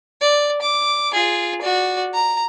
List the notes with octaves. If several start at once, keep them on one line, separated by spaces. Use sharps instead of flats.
D5
D6
F4 G#4
F#4 D5
A#5